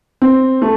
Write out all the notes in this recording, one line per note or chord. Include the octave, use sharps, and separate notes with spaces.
C4
A3